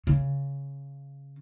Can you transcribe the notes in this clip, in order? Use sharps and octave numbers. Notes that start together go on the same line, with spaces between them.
C#3